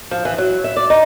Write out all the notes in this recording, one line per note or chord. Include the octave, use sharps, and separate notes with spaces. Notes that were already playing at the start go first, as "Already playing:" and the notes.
F3
E3
F#3
E5
D5
D#4